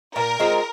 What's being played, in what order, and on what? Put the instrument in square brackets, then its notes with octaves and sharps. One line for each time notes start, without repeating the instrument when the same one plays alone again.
[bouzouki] A#2 [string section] A#4
[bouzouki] G#3 C4 F4